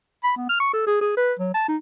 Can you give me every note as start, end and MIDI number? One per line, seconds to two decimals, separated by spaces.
0.24 0.32 83
0.37 0.47 59
0.49 0.57 89
0.60 0.70 85
0.73 0.86 69
0.87 0.99 68
1.01 1.13 68
1.17 1.34 71
1.39 1.53 54
1.54 1.65 81
1.68 1.77 63